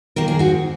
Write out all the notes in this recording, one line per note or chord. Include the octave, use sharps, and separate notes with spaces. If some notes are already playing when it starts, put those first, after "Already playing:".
D#3 A#3 A#4
G#4
G#2 F#4